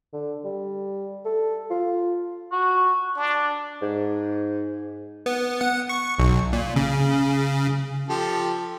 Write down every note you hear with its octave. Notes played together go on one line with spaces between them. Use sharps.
D3
G3
A4
F4
F#4
D4
G#2
B3
F#5
C#6
B1
A#2
C#3
F3 G4 A4